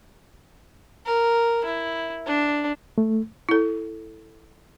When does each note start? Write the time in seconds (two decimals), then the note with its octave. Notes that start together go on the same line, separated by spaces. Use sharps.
1.06 A#4
1.65 E4
2.26 D4
2.98 A3
3.49 E4 A4